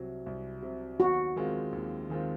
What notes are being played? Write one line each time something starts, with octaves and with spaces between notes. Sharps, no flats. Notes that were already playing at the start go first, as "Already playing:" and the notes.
Already playing: C2 C3 F#3
C2
C3 F#3
D#2 F#4
D#3 G#3 C4 F4
D#2
D#3 G#3 C4 F4